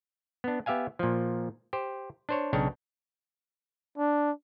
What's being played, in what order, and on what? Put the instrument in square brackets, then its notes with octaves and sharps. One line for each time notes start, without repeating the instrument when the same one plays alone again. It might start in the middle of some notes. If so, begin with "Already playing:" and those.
[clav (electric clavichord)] B3 D4
B3 G4 E5 F5 G#5
A#2 F3
G4 C5
D4 C5 C#5
B1 C#3 D4 C#5 G5
[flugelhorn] D4